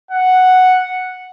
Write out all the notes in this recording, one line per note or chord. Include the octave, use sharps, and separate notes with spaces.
F#5